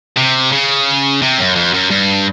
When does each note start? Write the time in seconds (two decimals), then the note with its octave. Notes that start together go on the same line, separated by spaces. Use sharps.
0.17 C3
0.52 C#3
1.22 C3
1.38 F#2
1.56 F2
1.74 F#2
1.90 G2